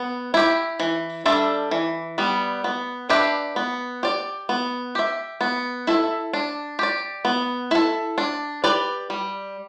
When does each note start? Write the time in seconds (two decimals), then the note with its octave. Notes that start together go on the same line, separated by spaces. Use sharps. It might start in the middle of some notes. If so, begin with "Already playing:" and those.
Already playing: B3
0.34 E4 G4
0.80 E3
1.26 G3 D4 A4 E5
1.71 E3
2.18 G3 B3
2.64 B3
3.09 D4 G4 B4 E5
3.56 B3
4.03 G4 D5
4.49 B3
4.95 G4 E5
5.41 B3
5.87 E4 A4 E5
6.33 D4
6.79 G4 D5
7.25 B3
7.71 E4 A4
8.18 D4
8.64 G4 B4 D5
9.10 G3